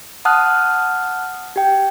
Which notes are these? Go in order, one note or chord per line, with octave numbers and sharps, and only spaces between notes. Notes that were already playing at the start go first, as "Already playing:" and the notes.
F#5 A5 D#6 F6 F#6
G4 G5